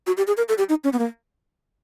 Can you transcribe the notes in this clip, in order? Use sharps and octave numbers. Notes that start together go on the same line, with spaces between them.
F#4
G4
G#4
A#4
A4
G4
D#4
C#4
B3
A#3